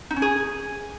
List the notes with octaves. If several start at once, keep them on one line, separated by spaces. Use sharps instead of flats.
D#4
C#4
G#4